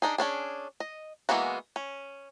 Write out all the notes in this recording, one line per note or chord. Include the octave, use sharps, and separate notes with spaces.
D4 D#4 G#4
C#4 D4 G#4
D#5
E3 G#3 A#3 B3 F#4
C#4